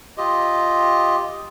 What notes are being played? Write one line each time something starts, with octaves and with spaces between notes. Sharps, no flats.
F4 G4 D#5